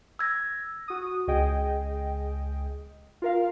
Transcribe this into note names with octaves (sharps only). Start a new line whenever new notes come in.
E6 G#6 A#6
F#4 D#6
C#2 G#4 D#5 G5
F4 A#4 F5